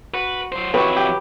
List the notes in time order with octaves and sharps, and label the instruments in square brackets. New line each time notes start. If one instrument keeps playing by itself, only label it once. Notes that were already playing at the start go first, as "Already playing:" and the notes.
[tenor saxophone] F#4 [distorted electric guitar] B4
[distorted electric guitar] F#3 C5
[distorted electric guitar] F2 E4 [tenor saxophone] F#3 [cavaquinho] G4 C#6 [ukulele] B4
[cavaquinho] G4